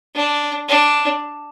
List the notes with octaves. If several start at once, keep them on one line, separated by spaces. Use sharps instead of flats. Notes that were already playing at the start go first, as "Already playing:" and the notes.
D4
D4